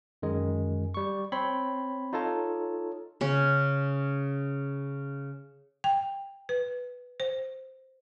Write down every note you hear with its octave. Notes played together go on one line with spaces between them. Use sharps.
F#2 D#3 G#3
G3 C#6
C4 C#5 B5 C6
D#4 F4 A4 C#5 A5
C#3 C#4
G5
B4
C5